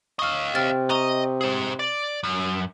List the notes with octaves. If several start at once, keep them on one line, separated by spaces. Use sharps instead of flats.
D#5 F5 C#6 F6
C3 G5 F6 A6
D#5 A#5 C#6 D#6
G#4 C5
D5
F#2